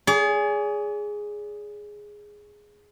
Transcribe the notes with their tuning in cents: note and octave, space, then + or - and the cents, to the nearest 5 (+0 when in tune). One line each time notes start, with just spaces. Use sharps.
G#4 +0 D5 -45